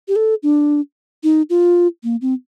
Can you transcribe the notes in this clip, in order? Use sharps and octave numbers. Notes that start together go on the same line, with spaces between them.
G4
A4
D4
D#4
F4
A#3
C4